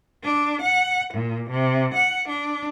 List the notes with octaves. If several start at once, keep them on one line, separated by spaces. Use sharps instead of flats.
D4
F#5
A#2
C3
F#5
D4